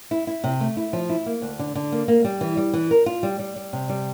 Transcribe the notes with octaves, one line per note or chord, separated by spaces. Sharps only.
E4
E4
C3
A3
E4
F3
E4
A#3
D2
D3
D3
A#3
A#3
G3
E3
G3
E3
A#4
F4
G3
G3
G3
C3
G3